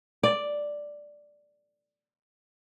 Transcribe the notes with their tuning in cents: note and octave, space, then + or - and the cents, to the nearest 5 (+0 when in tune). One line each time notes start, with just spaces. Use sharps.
D5 +0